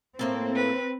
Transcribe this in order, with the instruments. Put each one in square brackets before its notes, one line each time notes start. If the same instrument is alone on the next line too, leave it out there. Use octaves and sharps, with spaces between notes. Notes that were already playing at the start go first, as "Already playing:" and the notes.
[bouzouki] A2 A#3 A4 [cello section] C4
[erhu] B4